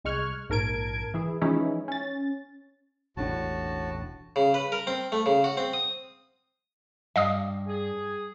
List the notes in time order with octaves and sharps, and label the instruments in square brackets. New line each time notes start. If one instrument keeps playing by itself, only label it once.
[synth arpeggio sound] C2 G#3 C#6 F6 F#6 G#6
A#1 G#2 A#4 A5 G#6 D7
E3 E4 G#4
E3 F3 G#3 C#4 D#4 E4
C#4 A6
[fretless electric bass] E1 A1 D4 [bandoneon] A2 F#4 A5
[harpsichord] C#3
B4
A#4
C4
A3
C#3
F#4
C4
D#6
[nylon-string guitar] G2 [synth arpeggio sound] D#5 F5 D#6
[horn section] G#4